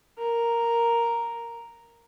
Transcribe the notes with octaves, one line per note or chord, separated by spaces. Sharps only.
A#4